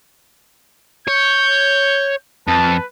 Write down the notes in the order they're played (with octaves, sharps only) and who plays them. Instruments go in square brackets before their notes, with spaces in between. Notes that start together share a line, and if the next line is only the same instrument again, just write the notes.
[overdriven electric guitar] C#5 [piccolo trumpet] G6
[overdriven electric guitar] F2 [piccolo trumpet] B4 [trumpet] A5